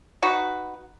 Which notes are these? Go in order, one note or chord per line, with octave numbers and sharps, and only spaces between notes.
D#4 F#4 B4